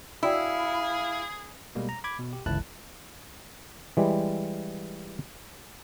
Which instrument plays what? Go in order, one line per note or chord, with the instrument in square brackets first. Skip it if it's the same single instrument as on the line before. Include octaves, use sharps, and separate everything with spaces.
[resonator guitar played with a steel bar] E4 [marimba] F#4 D5 G5 [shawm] G#4 [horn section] F5
[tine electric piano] B2 G3 G#3 A#3
A#5
B5 D6 G#6
B2
G4
G1 C#2 E3 E4 A5 F#6
[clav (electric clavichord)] E3 G3 G#3